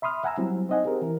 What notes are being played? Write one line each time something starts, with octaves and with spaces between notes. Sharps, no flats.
E5 B5 C6 D#6 F6
E5 F#5 G#5 A#5 E6
F#3 G3 C4 E4
C4 D#4 D#5 F#5 G#5
C4 G4 G#4 A#4
E3 E4 A#4